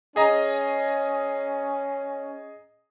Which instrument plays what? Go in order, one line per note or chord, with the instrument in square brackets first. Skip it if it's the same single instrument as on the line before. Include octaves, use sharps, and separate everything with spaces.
[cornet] C#4 [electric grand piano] G#4 D#5 A#5